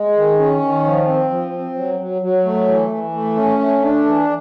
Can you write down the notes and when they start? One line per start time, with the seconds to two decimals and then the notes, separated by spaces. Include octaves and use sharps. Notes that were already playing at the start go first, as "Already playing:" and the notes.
Already playing: G#3
0.16 D#3
0.39 C#4
0.62 D#3
0.85 F3
1.07 C4
1.30 F3
1.54 C4
1.76 F#3
2.00 F#3
2.22 F#3
2.45 A3
2.68 E3
2.91 E3
3.14 A3
3.36 C#4
3.59 A3
3.83 D4
4.05 E3